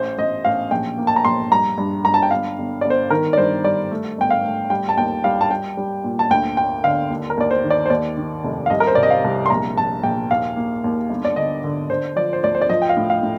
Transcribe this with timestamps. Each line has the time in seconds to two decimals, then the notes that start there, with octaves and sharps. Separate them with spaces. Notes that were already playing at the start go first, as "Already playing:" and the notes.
Already playing: A1 C5
0.18 A1 D#5
0.45 A1 F5
0.71 A#1 G5
0.98 A#3
1.07 A5
1.16 A#5
1.25 A#1 C6
1.51 G2 A#5
1.78 G2
2.04 G2 A#5
2.14 A5
2.23 G5
2.31 G1 F5
2.58 G1
2.81 G1 D5
2.90 C5
3.10 D#3 A#4
3.33 D5
3.37 G2 C5
3.64 G3 D5
3.91 A3
4.18 G1 G5
4.30 F5
4.44 A3
4.70 G3 G5
4.89 A5
4.97 D#2 G5
5.24 G3 F5
5.41 A5
5.51 G3 G5
5.77 G3
6.04 A#2
6.19 A5
6.30 D2 G5
6.57 A#3 G5
6.84 D3 F5
7.10 D#2
7.30 A#4
7.37 D#2 D5
7.51 C5
7.64 D#3
7.70 D5
7.86 C5
7.90 D#2 D5
8.17 D#3
8.44 F1
8.66 F5
8.70 C2 D#5
8.80 A#4
8.87 C5
8.95 C3 D5
9.03 D#5
9.10 F5
9.24 C2
9.46 C6
9.50 A#1 A#5
9.77 A#1 A5
10.03 A#1 G5
10.31 D#2 F5
10.56 A#3
10.84 D#2
11.09 G1
11.25 D5
11.36 D3 D#5
11.64 D3
11.90 D3 C5
12.16 F3 D5
12.33 C5
12.43 D2 D5
12.55 C5
12.62 D5
12.69 F3 D#5
12.82 G5
12.89 F5
12.97 A2
13.10 F5
13.23 A2